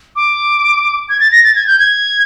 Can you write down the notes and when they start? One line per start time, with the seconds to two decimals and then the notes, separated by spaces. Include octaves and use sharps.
0.16 D6
1.09 G#6
1.20 A6
1.32 A#6
1.44 A6
1.56 G#6
1.67 G6
1.79 G#6